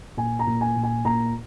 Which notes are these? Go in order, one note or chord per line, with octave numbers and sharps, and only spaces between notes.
A#2 G#5
A#5
A#2
G#5
A#2
G#5
A#2 A#5